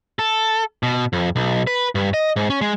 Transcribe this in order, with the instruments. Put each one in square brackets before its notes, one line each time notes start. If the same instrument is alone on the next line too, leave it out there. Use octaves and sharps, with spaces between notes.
[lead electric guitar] A4
B2
F2
B1
B4
G2
D#5
G#2
C#4
G#3